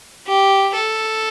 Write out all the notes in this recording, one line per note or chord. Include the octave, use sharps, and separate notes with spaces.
G4
A4